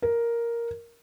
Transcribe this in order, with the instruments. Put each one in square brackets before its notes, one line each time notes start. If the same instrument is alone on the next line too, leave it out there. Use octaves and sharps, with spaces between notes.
[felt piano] A#4